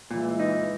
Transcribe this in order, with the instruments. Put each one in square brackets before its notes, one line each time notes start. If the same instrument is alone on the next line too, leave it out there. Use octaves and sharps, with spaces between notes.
[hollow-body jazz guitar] A#2 [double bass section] E3 G#3
[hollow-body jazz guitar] D#4